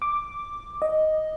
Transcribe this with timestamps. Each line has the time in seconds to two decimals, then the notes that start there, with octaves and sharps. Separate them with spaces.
0.02 D6
0.82 D#5